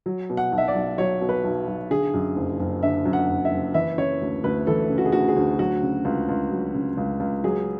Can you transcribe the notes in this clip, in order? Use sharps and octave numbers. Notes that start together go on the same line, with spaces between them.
F#3
B2
F#5
B1
E5
D5
B1
F#3 C#5
B2
B4
B1
B1
D3 G#4
F#2
F#1
F#1
D3 E5
F#2
F#5
F#1
E5
F#1
E3 E5
C#3 C#5
D2
D2 B4
E3 A4
C#3
F#4
G#4
D2 F#4
G#4
D2
F#3 F#4
C#3
C#2
C#2
F#3
C#3
C#2
C#2
F#3 G#4